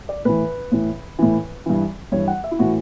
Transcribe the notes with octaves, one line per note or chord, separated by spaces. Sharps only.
D5
A2 E3 B4
A2 E3
A2 E3
G2 E3
G2 E3 C#5
F#5
E5
E4
A2 E3 F#4